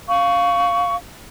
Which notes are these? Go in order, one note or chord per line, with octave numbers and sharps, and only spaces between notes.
F5 C#6